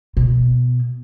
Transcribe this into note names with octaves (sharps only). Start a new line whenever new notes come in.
B2